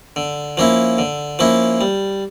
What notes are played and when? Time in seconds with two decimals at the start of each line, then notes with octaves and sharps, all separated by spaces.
0.16 D3
0.57 F3 A#3 C#4 E4
0.98 D3
1.39 F3 A#3 C#4 E4
1.81 G3